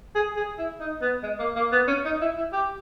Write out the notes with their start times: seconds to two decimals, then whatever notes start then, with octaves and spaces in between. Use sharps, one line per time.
0.15 G#4
0.37 G#4
0.58 E4
0.80 D#4
1.02 B3
1.23 G#3
1.39 A#3
1.56 A#3
1.72 B3
1.88 C#4
2.05 D#4
2.21 E4
2.38 E4
2.53 G4